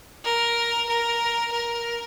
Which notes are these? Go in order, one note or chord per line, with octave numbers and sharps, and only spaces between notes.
A#4
A#4
A#4